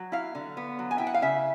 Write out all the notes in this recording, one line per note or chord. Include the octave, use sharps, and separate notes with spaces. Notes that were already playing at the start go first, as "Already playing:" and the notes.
Already playing: F#3
E4 F5
D3
B3
F#3
G#5
E4 G5
F#5
F5
C#3 E5